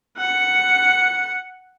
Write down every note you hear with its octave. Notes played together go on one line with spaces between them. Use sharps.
F#5 C#7